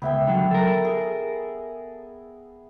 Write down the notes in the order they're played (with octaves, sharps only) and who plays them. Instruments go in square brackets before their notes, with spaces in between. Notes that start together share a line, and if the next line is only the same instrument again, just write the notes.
[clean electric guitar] C#2 [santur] B3 E5 G5
[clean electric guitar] D3 F#3 [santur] B5
[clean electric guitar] A4 A#4
[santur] G#4